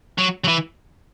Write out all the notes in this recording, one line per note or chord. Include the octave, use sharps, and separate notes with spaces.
F#3
F#3
E3